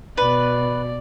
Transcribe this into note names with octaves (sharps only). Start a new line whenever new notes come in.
B2 B4 D5